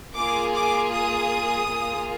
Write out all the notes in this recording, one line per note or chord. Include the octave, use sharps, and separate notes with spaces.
A#3 F4 G#4 D6
D6
D#6
A#3 F4 G#4